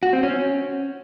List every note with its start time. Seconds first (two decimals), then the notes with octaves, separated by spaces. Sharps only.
0.03 F#4
0.13 C4
0.23 C#4